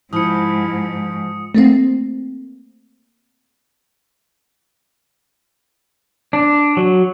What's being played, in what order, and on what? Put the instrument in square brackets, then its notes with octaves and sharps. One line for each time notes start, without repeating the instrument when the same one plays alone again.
[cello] G#2 [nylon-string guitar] F3 [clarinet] E4 [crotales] D#6 C#7
[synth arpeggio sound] A3 A#3 C4
[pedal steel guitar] D4
F#3